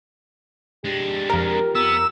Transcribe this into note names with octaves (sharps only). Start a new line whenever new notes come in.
G#3 D4 G4
F2 A#4
B3 E6